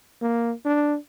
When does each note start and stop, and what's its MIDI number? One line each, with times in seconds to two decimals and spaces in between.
0.22 0.52 58
0.65 0.96 62